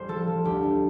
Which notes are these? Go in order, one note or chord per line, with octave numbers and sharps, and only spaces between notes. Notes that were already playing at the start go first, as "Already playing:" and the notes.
Already playing: A1 G3 C5
F3 A4
F3
D2 G4
D2